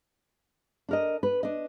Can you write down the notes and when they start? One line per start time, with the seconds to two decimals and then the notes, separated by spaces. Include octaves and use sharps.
0.89 D4 A#4 D#5
1.23 B4
1.43 D4 D#5